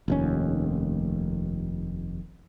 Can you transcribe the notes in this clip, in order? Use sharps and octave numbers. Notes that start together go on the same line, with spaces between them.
F1 D#2 C#4